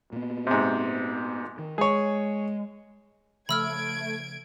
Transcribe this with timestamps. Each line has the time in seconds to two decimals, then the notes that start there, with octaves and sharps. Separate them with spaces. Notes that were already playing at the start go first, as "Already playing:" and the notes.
0.13 A#2 B3
0.47 G#2 C3
1.58 D#3
1.78 G#3 G#4 C#5
3.49 C#3 F3 A3 B5 E6 F6 G#6 D7